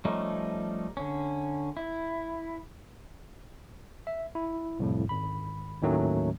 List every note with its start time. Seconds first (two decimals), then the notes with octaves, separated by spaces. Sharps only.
0.05 F3 G3 A3 C#4 D#4
0.97 D3 C#4
1.77 E4
4.07 E5
4.35 E4
4.79 C2 F2 A2
5.09 G#1 B5
5.82 D#2 A2 D#3 F#3 A3 C#4